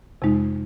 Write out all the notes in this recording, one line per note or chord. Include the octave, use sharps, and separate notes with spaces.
F2 C3 G#3 D#4